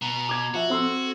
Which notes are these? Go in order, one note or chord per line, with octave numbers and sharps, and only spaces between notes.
B2 A#5
D6 G#6
F3 F#4 E5
C4 A4 C6 E6